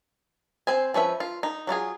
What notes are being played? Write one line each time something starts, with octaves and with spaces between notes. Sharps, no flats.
C4 C5 G#5
F3 C#4 B4 E5
F4
D#4
F#3 D4 F4 G#4